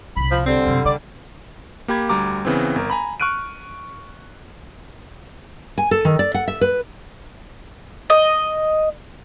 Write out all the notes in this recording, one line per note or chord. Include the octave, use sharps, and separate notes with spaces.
C2 A#2 B5
F3
D3 G3 C4
F#2 C3
C#3 D5
A#3 G4 B5 G#6
D2 G3 A#5 D6
C#3 E3 B3 C4
G1 A#4
G#5 A#5 B5
C#6 F6 F#6 D7 D#7
G#5
A4
D#3
D5
F#5
E5
B4
D#5